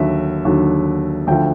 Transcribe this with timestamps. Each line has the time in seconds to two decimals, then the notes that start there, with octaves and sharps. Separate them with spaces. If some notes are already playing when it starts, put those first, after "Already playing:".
Already playing: D#2 D3 F#3 E5
0.45 D#2 D3 F#3
1.27 D2 D3 F3 G5